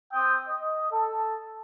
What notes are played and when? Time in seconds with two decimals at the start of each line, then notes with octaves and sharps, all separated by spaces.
0.12 C4 G5 D#6
0.49 D#5
0.92 A4